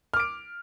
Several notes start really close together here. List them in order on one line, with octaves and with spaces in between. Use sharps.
F6 D6 D7